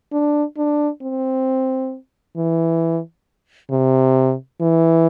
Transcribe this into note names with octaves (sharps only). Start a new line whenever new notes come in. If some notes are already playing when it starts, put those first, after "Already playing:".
D4
D4
C4
E3
C3
E3